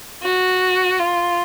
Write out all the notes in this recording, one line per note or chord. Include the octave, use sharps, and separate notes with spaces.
F#4
F4